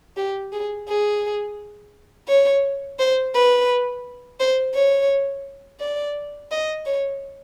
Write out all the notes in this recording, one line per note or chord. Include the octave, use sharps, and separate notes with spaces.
G4
G#4
G#4
C#5
C5
B4
C5
C#5
D5
D#5
C#5